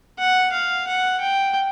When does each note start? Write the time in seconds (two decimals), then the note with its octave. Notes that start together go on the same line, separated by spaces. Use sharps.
0.19 F#5
0.53 F5
0.87 F#5
1.20 G5